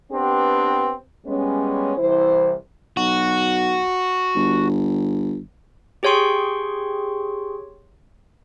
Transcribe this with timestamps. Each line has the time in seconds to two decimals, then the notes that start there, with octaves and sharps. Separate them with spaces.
0.12 B3 C4 D4 G4 B4
1.26 G3 G#3 B3 C#4
1.97 C2 E3 E4 C5
2.97 B1 F#4
4.35 G1
6.03 G4 G#4 C#5 G5 C6 C#6